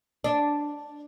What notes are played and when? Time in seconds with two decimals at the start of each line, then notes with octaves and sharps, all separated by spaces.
0.24 D4